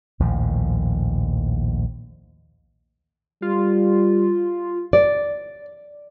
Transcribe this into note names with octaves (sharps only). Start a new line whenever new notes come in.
A#1 D#2 A2 F3
G3 F4
D5